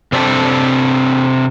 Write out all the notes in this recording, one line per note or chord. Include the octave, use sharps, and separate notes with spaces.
C3 C4 D4 G4 A4